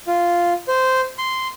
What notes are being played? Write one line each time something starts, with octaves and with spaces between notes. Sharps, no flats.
F4
C5
C6